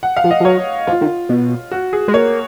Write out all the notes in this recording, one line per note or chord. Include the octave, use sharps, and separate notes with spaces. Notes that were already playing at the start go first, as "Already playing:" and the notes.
F#5
F5
F3
D#5
F3
F#3 C#5
F3 F4
D#3
B2
F#4
G#4
G#3
A#3 C#5